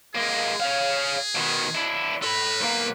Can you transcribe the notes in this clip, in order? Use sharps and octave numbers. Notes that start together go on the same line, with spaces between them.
G#3 A#3 G#4
C#5 F5
B2 D#3
D4 E4
A4 B4 B5
B1 A#3